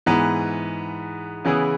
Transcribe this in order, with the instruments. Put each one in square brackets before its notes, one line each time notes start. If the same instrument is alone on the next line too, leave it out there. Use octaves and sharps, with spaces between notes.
[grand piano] G#2 E3 B3
C#3 E3 B3 E4 G#4